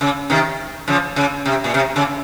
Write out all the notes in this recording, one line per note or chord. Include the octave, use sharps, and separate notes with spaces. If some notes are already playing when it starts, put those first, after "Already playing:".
C#3
C3 D#3
C#3 F3
C#3
C3
A#2
C3
C#3